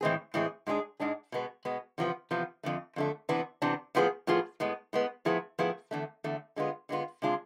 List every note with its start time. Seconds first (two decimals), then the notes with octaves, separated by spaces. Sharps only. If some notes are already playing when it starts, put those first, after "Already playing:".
0.01 A2 E3 G#3 C4 G#4
0.34 A2 E3 G#3 C4 G#4
0.67 G#2 G#3 D4 G#4
1.00 G#2 G#3 D4 G#4
1.32 B2 G#3 B3
1.65 B2 G#3 B3
1.98 E2 C3 F3 B3
2.31 E2 C3 F3 B3
2.63 F2 D3 A3
2.96 F2 D3 A3
3.29 C3 E3 B3 D4
3.62 C3 E3 B3 D4
3.95 A2 F3 B3 F4 G#4
4.27 A2 F3 B3 F4 G#4
4.60 A2 G#3 B3
4.93 A2 G#3 B3
5.25 A2 F3 B3 E4 G#4
5.59 A2 F3 B3 E4 G#4
5.91 E2 D3 A3
6.24 E2 D3 A3
6.56 D3 G#3 B3 F4
6.89 D3 G#3 B3 F4
7.22 C3 G#3 D4 F4 G#4